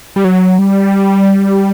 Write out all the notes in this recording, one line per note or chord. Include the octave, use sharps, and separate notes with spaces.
G3
F#3
G3